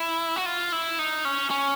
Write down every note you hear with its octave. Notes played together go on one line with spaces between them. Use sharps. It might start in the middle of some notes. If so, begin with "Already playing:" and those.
Already playing: E4
F#4
F4
E4
D#4
C#4
C#4